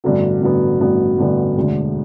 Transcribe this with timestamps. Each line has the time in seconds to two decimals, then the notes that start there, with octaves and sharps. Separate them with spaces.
0.04 A1 G2 D3 F#3 B3
0.41 A1 G2 D3 F#3 B3
0.79 A1 G2 D3 F#3 B3
1.18 A1 G2 D3 F#3 B3
1.57 E1 D2 D3